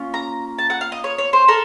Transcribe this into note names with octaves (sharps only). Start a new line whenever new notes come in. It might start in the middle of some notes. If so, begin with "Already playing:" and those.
Already playing: A#3 C#4 F4
A#5
A5
F#5
F5
D#5
C#5
C#5
C5
A4 A#4